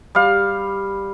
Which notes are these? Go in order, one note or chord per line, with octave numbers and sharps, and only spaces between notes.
G3 F5